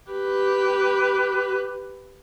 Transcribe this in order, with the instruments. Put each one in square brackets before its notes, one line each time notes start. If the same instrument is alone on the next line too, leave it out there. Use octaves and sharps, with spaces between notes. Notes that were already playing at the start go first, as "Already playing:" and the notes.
[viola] G4 B4